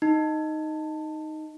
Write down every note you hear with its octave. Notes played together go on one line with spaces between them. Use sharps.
D#4